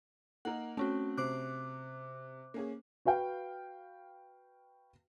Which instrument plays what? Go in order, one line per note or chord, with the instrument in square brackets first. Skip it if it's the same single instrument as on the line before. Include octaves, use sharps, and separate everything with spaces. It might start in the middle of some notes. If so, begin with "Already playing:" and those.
[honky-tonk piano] A#3 D#4 A#4 [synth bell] F#5
[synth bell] A3 C#4 F#4 [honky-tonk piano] C4
[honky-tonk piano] C3 [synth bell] C5 D6 F#6
[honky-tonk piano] A#3 C#4 G#4
[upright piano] F#4 B4 F5 G5